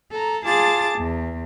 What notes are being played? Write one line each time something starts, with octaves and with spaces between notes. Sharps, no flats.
A4 A#5
F4 G#4 A5 D6 A6
E2